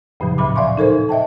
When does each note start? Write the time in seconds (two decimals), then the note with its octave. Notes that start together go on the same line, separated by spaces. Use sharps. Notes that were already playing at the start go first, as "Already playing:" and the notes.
0.20 F2 A2 C#3 F3 F#3
0.38 D2 A#2 B5 D6
0.56 D5 E5 F5 G#5 C6 C#6
0.77 D#4 A4 A#4 C5
1.09 D#5 E5 G5 A5